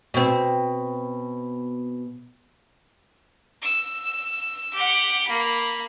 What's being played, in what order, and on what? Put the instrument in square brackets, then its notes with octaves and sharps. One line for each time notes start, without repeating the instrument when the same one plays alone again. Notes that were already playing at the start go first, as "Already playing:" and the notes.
[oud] B2 C4
[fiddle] E6
G4 F#5
A#3 B5